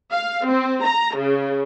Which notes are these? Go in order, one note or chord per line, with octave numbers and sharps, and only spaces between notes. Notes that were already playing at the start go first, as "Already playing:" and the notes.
F5
C4
A#5
C#3